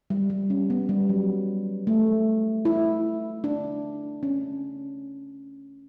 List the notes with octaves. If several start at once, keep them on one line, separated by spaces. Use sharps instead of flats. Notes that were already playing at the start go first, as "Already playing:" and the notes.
G3
G3
C#4
B3
G3
F#3
A3
E4
D4
C#4